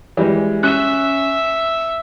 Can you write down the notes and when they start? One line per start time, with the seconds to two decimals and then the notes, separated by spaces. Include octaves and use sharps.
0.17 E3 G3 G#3
0.63 C#4 E5 F#6